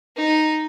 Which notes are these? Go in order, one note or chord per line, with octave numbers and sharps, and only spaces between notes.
D#4